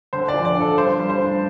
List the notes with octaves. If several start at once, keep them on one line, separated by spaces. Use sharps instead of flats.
D3 C5
D5
F3
D5
D4 A4
G2 C5
G3
C5
D4